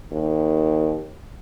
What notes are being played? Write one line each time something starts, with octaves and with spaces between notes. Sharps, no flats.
D#2